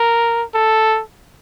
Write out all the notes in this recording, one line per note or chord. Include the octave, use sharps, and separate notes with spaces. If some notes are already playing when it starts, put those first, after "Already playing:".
Already playing: A#4
A4